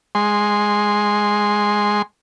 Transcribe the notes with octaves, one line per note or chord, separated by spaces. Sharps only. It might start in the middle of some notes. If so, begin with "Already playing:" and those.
G#3 C6